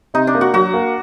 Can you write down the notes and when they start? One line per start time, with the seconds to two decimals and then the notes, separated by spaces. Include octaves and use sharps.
0.14 C3 D#4
0.27 D4
0.35 A#3
0.41 F#4
0.54 F#3 F#4
0.74 A#3